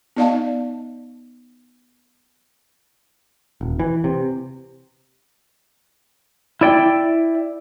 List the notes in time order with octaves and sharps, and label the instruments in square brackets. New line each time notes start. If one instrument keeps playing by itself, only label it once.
[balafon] B3 D#4 D5 D#5 F5 A5
[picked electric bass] D#1
E3
C3
[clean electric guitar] E4 D5 G5